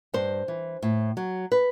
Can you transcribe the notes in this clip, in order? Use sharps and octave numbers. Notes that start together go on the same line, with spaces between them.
G2 C5
E3
A2
F#3
B4